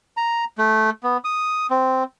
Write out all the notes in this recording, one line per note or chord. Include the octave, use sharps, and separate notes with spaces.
A#5
A3
B3
D#6
C4